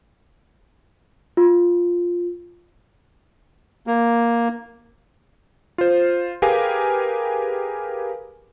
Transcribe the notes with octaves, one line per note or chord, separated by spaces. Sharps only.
F4
A#3
F4 C5
G4 G#4 A#4 B4 F5 G#5